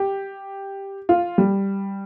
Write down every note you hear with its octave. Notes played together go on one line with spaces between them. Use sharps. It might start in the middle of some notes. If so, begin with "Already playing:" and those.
Already playing: G4
F4
G3